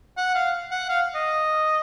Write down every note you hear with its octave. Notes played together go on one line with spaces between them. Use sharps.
F#5
F5
F#5
F5
D#5